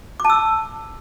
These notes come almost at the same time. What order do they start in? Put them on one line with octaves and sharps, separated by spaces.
D6 A5 E6